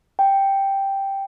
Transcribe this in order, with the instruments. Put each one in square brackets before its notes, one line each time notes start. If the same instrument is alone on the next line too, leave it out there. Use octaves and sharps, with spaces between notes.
[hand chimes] G5